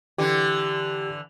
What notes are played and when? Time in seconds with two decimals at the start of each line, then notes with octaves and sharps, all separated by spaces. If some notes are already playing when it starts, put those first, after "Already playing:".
0.18 D3 E3 G4